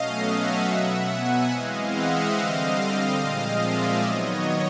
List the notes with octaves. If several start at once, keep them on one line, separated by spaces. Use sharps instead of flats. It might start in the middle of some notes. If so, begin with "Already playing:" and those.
Already playing: B2 F#3 A3 C#4 D#5 F5
E5 F#5
B2 F#3 B3
F#5 G#5
E3 G#3 C4 D#5 F5
E5 F#5
D3 G3 C4 D#5 F5
A#2 F3 G#3 C4
D5 E5
D#3 F#3 B3 C#5 D#5